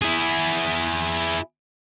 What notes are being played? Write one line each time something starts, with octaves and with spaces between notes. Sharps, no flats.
E4 G#4